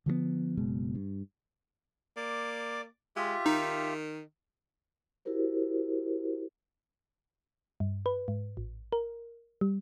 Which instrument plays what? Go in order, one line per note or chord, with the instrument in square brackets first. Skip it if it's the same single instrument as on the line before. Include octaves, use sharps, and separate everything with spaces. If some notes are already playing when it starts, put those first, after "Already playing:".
[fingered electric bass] D3 F3 G3 B3
F#1 B2 G#3
G2
[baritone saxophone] A#3 [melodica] D5 D6
[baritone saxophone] G#3 [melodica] F4 G4 E5
[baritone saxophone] D#3 [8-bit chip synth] D#4
[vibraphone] E4 F#4 G4 A#4 C5
[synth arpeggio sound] G2
B4
G#2
A1
A#4
G3